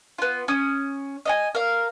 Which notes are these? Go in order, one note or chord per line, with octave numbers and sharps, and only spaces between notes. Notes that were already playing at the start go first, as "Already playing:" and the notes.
B3 F4
C#4 D#6
D#5 F5 G#5
A#4 F5